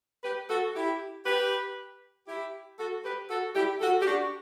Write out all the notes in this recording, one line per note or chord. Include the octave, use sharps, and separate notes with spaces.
G4 B4
F#4 A4
E4 G4
G4 B4
E4 G4
F#4 A4
G4 B4
F#4 A4
E4 G4
F#4 A4
G4
D4 F#4